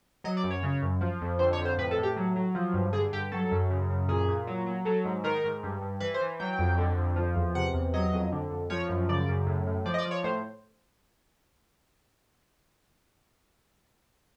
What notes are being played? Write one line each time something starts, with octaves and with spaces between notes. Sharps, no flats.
F#3 D#5
D5
F#2
C#5
C#3
F#2
F3
F2
D3 C5
C#5
F2
C5
A2 B4
A4
A2
G4
F#3
F#3
F3
G2
D3 G#4
G2 G4
F#3 A4
F#2
C#3
F#2
A#2 G#4
A#2
F#3
F#3
F#3 A4
G#2
D#3 A#4
G#2
G2
G2
E3 B4
C5
E3
F#3 G5
F2
D3
F2
F3
E2
C3 F#5
E2
F#3 D#5
F2
D3
F2
F3 C#5
F#2
C#3 D5
F#2
A2
A2
F3 D5
D#5
D5
F3
C#5
A2 C5